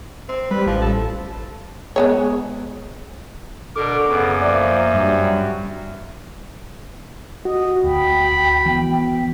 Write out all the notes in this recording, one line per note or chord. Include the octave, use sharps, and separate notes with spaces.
C4
G3 B4
A1 F3
A4
G#3 B3 C#5
B2 D3 A4 A#4 D6
F#2 C#3 B3
F3 A#3 D5 E5
G2 F#3 G3
F#4 D#5
D2 G5 B5
E3 B3